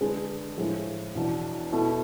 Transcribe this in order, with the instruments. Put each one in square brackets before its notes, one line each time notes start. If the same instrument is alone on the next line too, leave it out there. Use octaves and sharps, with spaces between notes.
[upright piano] D3 G#3 D4 G#4 B4
A2 F3 G#3
E2 B2 B3 D4
B2 A3 E4